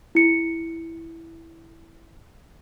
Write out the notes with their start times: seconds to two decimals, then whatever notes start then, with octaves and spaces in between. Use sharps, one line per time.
0.15 E4 C#7